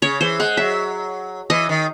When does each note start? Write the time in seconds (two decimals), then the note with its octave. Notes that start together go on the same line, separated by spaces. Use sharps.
0.02 C#3 C#5
0.21 E3 C5
0.39 G#3 F#5
0.57 F#3 E5
1.50 E3 D#5
1.69 D#3